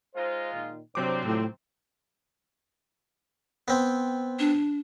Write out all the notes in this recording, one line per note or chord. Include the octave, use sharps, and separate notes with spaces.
G#3 D#4 F4 C5
A#2 D#3
G2 C3 F#3 C4 D4 C5 D6
A2 F3 G3
B3 C4
D4